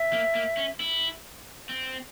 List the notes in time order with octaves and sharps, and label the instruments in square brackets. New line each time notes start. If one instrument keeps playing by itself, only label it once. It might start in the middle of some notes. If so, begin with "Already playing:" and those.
Already playing: [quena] E5
[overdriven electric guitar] A#3
A#3
C#4
E4
C4